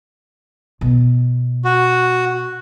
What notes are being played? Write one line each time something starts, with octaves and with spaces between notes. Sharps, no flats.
B2 B3
F#4